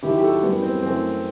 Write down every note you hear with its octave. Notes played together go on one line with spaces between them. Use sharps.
D#2 D#3 F#3 E4 G4
G4
F#4 A4
F#2 E3 G3 B3
C4
F#2 E3 A3 C4